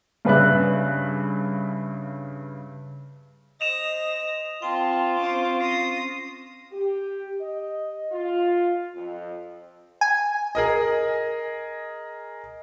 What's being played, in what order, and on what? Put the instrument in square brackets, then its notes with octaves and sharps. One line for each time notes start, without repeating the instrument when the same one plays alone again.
[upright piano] G2 C#3 B4 D5 E5 F#6
[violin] C5 A#6 [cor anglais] D#5 [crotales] D#6 E7 F7
[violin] C4 [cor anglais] F4 [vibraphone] G5 A5
[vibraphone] C4 C#4 [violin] C5 D6
[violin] D#6 A#6 [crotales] C7
[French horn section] G4
D#5
F4
F2
[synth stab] G#5
[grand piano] G#4 A#4 D#5